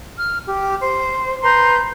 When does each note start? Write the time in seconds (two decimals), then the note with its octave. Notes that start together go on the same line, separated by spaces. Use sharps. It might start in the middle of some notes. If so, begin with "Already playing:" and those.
0.19 F6
0.47 G4
0.80 C5
1.42 B4 A#5 C6 G6